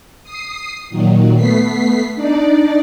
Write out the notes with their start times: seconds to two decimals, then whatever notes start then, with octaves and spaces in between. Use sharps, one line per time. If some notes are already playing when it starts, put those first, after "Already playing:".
0.23 D#6 C7
0.90 A#2 D#3 F#3
1.35 A3 B3 B6 C7
2.15 D4 D#4 D5